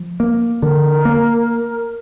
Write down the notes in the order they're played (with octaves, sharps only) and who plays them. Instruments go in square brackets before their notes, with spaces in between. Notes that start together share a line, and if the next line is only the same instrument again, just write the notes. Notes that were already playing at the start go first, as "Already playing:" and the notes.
Already playing: [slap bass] F3
A#3
[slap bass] D3 [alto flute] A#4
[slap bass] A#3